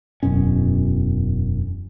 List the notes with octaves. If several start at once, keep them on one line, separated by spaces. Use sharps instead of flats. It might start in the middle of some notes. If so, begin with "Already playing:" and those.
E1 F#2 B2 C#4